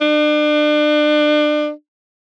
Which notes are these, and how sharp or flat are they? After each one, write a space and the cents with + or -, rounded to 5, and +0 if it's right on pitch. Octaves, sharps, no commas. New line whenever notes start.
D4 +35